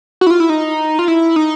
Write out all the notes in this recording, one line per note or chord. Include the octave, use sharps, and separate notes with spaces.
F#4
E4
F4
E4
D#4
F4
E4
D#4